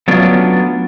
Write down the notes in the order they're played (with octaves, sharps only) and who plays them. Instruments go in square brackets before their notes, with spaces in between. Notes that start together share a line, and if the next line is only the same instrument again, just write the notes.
[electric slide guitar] F#3 A3 B3 C#4 D4 F4